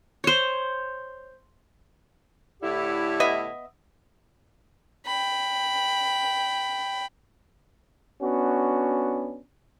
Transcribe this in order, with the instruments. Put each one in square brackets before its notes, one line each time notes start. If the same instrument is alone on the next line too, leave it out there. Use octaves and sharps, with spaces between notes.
[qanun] C5 C#5
[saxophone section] A2 D3 E4 [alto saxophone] G4
[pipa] B3 D#5 E5
[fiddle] G5 B5
[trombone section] B3 C#4 D4 F#4